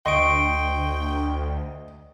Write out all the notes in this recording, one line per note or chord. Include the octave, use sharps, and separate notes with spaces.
D2 D#5 G5 C6 C#6 D7